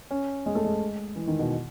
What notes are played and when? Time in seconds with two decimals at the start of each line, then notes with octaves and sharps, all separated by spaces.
0.11 C#4
0.46 G#3
0.55 A3
0.64 G#3
1.16 E3
1.27 D#3
1.39 B2